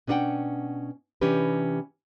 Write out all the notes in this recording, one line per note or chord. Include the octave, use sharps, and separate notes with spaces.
B2 C#4 D4 G#4 F#5 G5
C3 E3 C#4 D4 G4 B4